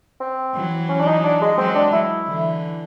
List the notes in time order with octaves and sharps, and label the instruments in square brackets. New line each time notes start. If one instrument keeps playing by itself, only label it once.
[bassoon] C4
[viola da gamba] E3 F#3
[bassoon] C#4
D4
D#4
D4
G#3
[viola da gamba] F#3 G#3 [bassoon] C4
[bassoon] D4
E4
[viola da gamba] D3 E3